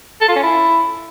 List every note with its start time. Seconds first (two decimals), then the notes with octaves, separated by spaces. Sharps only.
0.21 A4
0.28 F4
0.36 C#4
0.43 E4